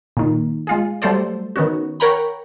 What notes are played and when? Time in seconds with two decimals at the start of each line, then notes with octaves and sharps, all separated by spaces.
0.17 A#2 D#3
0.67 G#3 F4 G#4
1.02 F#3 G3 A3 A4 C5 D5
1.56 D#3 B3 C#4 F#4
2.00 A#4 C#5 F#5 G5 A#5 B5